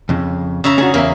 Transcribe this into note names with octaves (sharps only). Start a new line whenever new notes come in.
F2 C#3
C#3 E5 A#5
C#4 D4 F#4 G#4
E2 A#3 A#4 E5